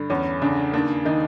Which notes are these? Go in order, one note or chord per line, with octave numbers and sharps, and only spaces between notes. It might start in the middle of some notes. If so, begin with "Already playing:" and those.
Already playing: G2 D3
E2 C#4
C#3 D4
D#2 D4
D#3 D#4